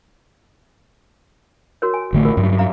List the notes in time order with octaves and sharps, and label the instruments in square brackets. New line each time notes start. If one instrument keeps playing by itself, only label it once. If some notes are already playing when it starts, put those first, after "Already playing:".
[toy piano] F#4 A#4 C#5
G#5
[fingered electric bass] A1 D3 A3
[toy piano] F4 A#4
[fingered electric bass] G2 F#3
[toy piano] E5 F5 A#5